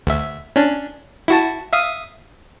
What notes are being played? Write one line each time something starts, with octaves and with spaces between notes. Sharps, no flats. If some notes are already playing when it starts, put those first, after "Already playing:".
D2 E5
C#4 D4
E4 F#4 A5
E5 F5 D#6